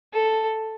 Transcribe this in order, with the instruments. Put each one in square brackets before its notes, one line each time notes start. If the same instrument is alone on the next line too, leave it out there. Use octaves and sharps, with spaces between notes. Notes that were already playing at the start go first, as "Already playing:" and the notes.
[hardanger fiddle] A4